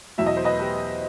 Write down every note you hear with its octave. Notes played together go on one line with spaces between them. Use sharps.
E2 B2 F#3 E5
D#5
C5
B4 D#5
G4 B4